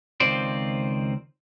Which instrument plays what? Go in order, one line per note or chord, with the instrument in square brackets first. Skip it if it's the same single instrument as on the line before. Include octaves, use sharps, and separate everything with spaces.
[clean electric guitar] C#2 D#3 C4 F4 C5 D5